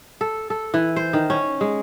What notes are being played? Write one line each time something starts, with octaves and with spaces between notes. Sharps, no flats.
A4
A4
E3
C5
D#3
C#4
G#3